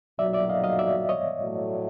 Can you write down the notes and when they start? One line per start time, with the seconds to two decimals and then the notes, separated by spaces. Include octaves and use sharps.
0.19 B1 A#2 F#3 D5 E5
0.33 D5 E5
0.49 D#5 F5
0.64 D#5 F5
0.79 D5 E5
1.09 C#5 D#5
1.39 A2 F#3 A3